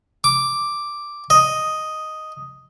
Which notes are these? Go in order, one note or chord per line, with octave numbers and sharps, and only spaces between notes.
D6
D#5